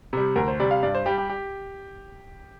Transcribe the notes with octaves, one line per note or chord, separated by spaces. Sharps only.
C3 G3
D2 A#4
C5
C3 G3 D5
F5
G2 D5
C5
G3 G4
G4
G4